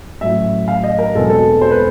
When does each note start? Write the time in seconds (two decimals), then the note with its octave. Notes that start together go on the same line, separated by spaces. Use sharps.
0.21 A1 A2 F#3 E5
0.68 F5
0.84 D#5
0.99 A#4
1.15 E1 E2 B2 G#3 C4 A4
1.30 A4
1.61 C5
1.71 B4